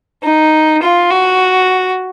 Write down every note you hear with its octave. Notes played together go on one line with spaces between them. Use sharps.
D#4
F4
F#4